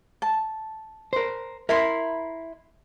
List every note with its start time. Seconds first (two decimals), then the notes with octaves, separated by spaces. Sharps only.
0.22 A5
1.13 A#4 C5
1.69 E4 A#4 E5 B5 C6